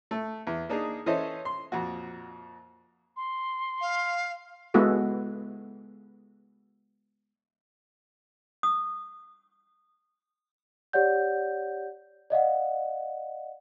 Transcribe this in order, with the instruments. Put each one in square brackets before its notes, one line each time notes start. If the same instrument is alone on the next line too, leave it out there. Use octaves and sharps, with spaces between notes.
[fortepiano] A3
E2
A#3 D4 D#4 G#4
E3 C#4 A4 C5 D#5 E5
C6
F2 A#2 F#4
[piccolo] C6
[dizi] F5
[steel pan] G#3 B3 E4 F#4 A4
[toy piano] D#6
[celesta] G4 C#5 D5 F#5 G6
D5 D#5 F5 F#5